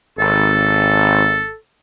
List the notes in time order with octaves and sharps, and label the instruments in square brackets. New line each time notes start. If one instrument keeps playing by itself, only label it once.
[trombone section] G#1 [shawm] A4